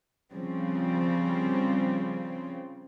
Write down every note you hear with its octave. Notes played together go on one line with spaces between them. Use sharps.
C#3 F3 G3 C4